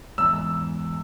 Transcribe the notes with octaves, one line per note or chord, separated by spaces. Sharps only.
E2 G#2 E6